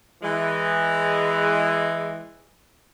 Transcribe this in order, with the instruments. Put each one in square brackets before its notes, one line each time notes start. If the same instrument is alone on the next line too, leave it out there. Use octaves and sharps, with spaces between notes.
[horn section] E3 G#3